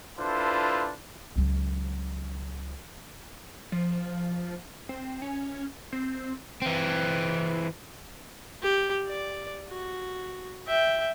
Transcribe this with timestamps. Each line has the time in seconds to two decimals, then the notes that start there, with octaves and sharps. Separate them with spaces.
0.20 D4 E4 F4 A4 B4 C5
1.36 C#2 F#3
3.72 F3
4.89 C4
5.22 C#4
5.93 C4
6.62 E3 C4
8.62 G4
9.08 D5
9.69 F#4
10.67 E5 G5